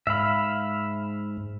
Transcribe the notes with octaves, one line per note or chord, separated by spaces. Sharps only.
G#2 E5 F5 B5